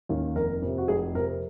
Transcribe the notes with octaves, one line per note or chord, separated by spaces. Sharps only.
D#2 D#3 A#3 C#4
F1 A#4
F2 C3
F#4
F1 G#4
F2 C3 A#4